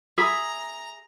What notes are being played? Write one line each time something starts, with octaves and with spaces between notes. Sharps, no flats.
G#4 E5 A#5 B5